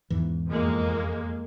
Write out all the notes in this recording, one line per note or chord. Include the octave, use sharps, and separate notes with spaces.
E2 G#2 E3
F2 G#3 A#3